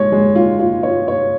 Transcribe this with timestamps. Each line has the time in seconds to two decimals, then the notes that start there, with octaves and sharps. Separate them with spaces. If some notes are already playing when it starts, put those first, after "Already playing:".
Already playing: G#3 C#5
0.12 G#3
0.35 F4
0.59 F4
0.83 C#5
1.08 C#5